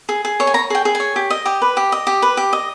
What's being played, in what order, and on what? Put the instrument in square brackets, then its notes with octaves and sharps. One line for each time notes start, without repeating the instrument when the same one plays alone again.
[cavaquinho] G#4
G#4
C#5
G#5
C#5 A#5
G#4 G5
G#4
G#5
C#5
G4
D#5
G4
B4
G4
D#5
G4
B4
G4
D#5